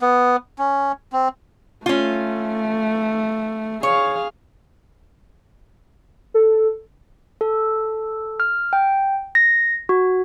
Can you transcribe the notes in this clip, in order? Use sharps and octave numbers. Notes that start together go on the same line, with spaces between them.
B3
C#4
C4
A3 C#4 F4
G#4 C#5 F5
A4
A4
F6
G5
A#6
F#4